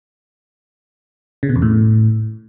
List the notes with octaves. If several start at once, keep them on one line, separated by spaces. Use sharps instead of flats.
C#3
B2
E2
A2